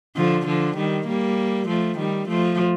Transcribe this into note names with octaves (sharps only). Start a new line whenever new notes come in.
D3 F3
D3 F3
D#3 G3
G3 A#3
F3 A3
D#3 G3
F3 A3